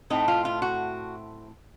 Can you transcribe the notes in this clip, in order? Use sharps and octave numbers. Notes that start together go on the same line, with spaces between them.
A2 A3 C4 D#4
F4
F4
F#4